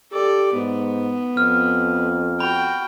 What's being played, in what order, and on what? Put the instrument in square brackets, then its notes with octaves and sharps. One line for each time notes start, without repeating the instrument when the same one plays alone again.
[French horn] G4 [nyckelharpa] A4 D5
[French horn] G#2 [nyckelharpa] B3
[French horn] F2 [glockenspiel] F6
[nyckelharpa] F#4 G5 [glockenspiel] B5